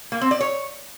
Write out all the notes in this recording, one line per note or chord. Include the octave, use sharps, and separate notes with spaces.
A#3
C4
D5
C#5